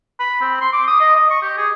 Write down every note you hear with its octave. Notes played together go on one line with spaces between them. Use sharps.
B5
C4
C6
D6
D#6
D#5
D#5
C#6
G4
G#4